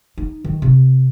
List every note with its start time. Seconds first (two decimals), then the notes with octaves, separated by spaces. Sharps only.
0.18 D#4
0.45 D#3
0.62 C3